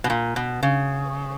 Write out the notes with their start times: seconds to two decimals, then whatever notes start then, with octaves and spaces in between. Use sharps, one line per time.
0.04 B2
0.10 A#2
0.36 B2
0.63 C#3